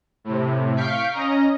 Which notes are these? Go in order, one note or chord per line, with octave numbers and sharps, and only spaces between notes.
A2 C3
F5 C#6 G6 B6 C7 D7
C#4 D#5 A#5